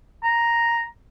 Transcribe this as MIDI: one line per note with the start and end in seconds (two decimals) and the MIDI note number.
0.23 0.85 82